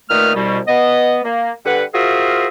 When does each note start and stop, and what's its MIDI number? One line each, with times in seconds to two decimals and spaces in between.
0.10 0.33 46
0.10 0.33 51
0.10 0.33 57
0.10 0.33 71
0.10 0.33 87
0.10 0.33 89
0.36 0.60 36
0.36 0.60 47
0.36 0.60 55
0.68 1.20 59
0.68 1.20 75
1.24 1.52 58
1.65 1.83 50
1.65 1.83 55
1.65 1.83 71
1.65 1.83 78
1.94 2.48 65
1.94 2.48 66
1.94 2.48 68
1.94 2.48 70
1.94 2.48 72
1.94 2.48 76